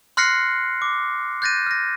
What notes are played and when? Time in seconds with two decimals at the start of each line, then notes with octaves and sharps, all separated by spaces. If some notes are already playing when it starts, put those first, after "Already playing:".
0.17 C6 F6 F#6 A#6 C7 C#7
0.82 D6
1.42 F#6 G6 A6 A#6 D#7
1.66 F6 A#6